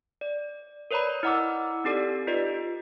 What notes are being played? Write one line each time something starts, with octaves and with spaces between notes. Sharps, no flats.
D5
A#4 B4 C#5 D5 A#5 B5
E4 D#5 F#5 A#5 D6 E6
C4 D#4 G4 A4 D5
F4 G4 B4 D5 D#5